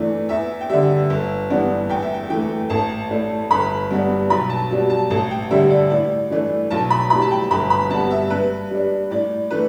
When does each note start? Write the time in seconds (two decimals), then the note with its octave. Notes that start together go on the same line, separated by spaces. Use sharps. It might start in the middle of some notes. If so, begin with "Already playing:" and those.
Already playing: E2 E3 A3 D4
0.29 E2 E5
0.61 G5
0.69 D3 G3 E5
1.10 G1
1.50 G2 E3 B3 D4
1.89 E2 G5
2.02 E5
2.14 G5
2.29 E3 A3 G5
2.70 A1 A5
3.10 A2 A3 D4
3.51 G1 B5
3.91 G2 G3 B3 D4
4.30 B1 B5
4.50 A5
4.70 B2 G3 D4
4.90 A5
5.10 A1 A5
5.31 G5
5.51 G2 D3 G3 E5
5.70 D5
5.90 A2 D5
6.30 E3 A3 D4
6.71 B1 A5
6.90 B5
7.10 A2 G3 B5
7.22 A5
7.31 G5
7.51 G1 B5
7.70 B5
7.90 G2 G3 B3 A5
8.11 E5
8.30 G2 B4
8.70 G3 D4
9.11 A2 D5
9.51 E3 A3 B4